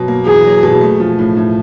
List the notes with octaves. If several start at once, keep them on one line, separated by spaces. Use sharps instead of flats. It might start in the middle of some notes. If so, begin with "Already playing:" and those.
Already playing: B2 F#3
A#3
E2 G#4
F#3
B2
A3
F3
A2
A2